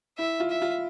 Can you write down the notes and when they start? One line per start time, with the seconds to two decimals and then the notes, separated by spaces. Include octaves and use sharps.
0.18 E4 E5
0.40 F4
0.50 E5
0.62 F4